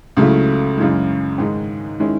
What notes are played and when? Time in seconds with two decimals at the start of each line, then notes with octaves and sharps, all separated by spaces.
0.17 C#2 C#3 F#3 A3 E4
0.78 F#2 C#3 E3 G#3
1.38 G#2 D#3 G#3 D#4
2.00 D#3 G#3 C#4 E4